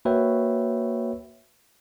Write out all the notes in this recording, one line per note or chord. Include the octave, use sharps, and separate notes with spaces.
A#3 F#4 B4 C#5 E5 G5